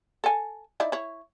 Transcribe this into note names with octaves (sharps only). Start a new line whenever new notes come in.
A4 G#5
D#4 E4 D5
E4 C#5